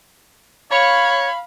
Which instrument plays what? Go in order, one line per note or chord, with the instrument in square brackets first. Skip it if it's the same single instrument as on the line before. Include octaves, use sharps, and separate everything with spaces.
[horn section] C#5 [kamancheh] F5 B5